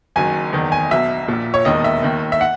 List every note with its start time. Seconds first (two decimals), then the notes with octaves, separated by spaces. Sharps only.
0.16 F#1 F#2 D#3 G#5
0.53 F#1 E2 D#3
0.72 G#5
0.91 B1 B2 E5
1.28 A#1 A#2
1.54 C#5
1.65 E1 D#2 D#3 D#5
1.84 E5
2.03 D#2 D#3
2.32 E5
2.41 F#5